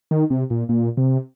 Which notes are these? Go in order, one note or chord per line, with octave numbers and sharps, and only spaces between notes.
D#3
C3
A#2
A#2
C3